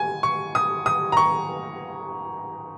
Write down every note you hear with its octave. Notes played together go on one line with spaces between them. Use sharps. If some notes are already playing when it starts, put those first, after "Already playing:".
Already playing: G#5
C#6
D#6
D#6
A#5
C#6